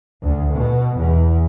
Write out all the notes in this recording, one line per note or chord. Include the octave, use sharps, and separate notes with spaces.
D2
B2
E2